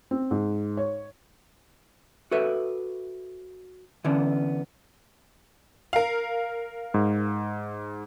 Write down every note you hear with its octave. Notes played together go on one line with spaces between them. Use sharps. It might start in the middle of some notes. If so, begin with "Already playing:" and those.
C4
G#2
C#5
F#4 A4 B4 E5
D3 E3 B3 C#4 D4
A#4 F5
G#2